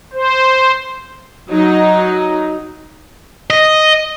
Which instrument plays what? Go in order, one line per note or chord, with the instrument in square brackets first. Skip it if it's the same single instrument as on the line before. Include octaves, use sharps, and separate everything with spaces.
[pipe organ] C5
[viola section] F#3 D#4
[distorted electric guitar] D#5